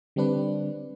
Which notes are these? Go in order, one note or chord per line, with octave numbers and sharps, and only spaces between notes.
D3 G3 C4 D4 B4